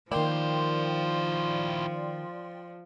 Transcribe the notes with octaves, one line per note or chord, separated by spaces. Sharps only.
D#3 F3 A#3 E4 C5 D5 G5 C6